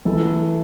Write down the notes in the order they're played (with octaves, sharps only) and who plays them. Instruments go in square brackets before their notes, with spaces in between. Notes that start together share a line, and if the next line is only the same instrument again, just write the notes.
[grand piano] E3 A3 E4 A4